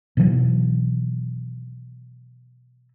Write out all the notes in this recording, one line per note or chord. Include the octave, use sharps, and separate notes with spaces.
B2 D#3 E3 F#3